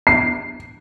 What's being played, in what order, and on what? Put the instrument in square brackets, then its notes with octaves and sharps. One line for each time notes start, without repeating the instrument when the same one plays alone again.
[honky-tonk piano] C7